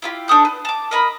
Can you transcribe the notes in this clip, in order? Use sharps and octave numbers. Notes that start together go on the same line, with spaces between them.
E4 F4 G4
D4 A4 D#6 G6
B4
A5 D6
A#4 D#5 B5